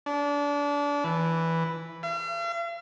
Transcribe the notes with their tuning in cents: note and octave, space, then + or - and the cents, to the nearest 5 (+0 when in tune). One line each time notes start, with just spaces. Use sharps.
D4 -25
E3 -5
F5 -45